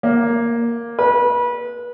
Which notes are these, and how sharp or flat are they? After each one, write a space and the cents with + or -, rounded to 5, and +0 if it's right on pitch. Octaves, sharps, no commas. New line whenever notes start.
A#3 +5
B4 -30